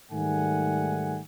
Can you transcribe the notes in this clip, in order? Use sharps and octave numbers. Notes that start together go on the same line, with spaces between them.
G#2 D#3 G3 A3 F#5 G#5